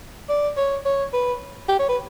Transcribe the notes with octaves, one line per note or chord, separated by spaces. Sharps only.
D5
C#5
C#5
B4
G4
C#5
B4